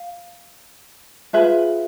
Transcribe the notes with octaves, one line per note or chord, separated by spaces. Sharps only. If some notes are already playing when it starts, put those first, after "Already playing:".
Already playing: F5
F4 G#4 B4 E5